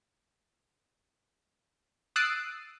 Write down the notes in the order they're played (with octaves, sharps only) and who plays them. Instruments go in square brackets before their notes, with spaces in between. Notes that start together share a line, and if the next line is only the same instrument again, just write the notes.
[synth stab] D#6 E6 F#6 A6 C7 D7